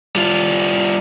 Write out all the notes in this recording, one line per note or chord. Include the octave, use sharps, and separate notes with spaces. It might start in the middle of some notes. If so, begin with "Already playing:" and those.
G3 F4